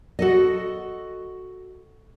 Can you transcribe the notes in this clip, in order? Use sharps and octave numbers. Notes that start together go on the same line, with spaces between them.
F#4 A4 D#5